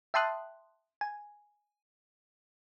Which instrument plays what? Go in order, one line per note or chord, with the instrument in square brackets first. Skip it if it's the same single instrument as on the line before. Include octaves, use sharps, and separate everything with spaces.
[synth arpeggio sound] E5 G5 A5 C6 D#6 F#6
G#5